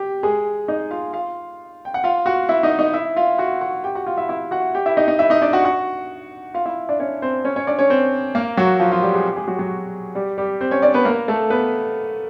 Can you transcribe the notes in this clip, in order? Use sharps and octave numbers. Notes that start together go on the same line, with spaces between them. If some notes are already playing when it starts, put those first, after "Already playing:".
Already playing: G4
G#3 G#4
D#4 D#5
F4 F5
F4 F5
G5
F#5
F4 F5
F#4 F#5
E4 E5
D#4 D#5
D#4 D#5
E4 E5
F4 F5
F#4 F#5
F#4 F#5
G4 G5
F#4 F#5
F4 F5
E4 E5
E4 E5
F#4 F#5
G4 G5
E4 E5
D#4 D#5
D#4 D#5
E4 E5
D#4 D#5
D4 D5
F#4 F#5
F#4 F#5
F4 F5
E4 E5
D4 D5
C#4 C#5
C4 C5
C#4 C#5
C#4 C#5
D4 D5
C#4 C#5
C4 C5
A#3 A#4
F#3 F#4
F3 F4
F3 F4
G3 G4
G#3 G#4
G4
G#3 G#4
F#3 F#4
F#3 F#4
G3 G4
G3 G4
C4 C5
C#4 C#5
D4 D5
B3 B4
A#3 A#4
A3 A4
B3 B4